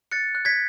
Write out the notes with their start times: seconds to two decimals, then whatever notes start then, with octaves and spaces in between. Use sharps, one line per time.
0.11 F#6 A6 C#7
0.35 F#6
0.45 G#6 B6